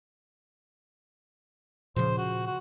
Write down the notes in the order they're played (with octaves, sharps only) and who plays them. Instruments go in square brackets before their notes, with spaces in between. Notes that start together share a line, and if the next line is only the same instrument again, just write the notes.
[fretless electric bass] A#2 C#3 F3 [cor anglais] C5
[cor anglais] F#4
F#4